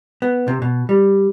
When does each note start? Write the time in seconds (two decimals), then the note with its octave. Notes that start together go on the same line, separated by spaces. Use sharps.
0.22 B3
0.48 C3
0.62 B2
0.89 G3